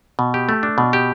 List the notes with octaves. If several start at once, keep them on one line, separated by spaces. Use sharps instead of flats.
B2
G4
A3
D4
B2
G4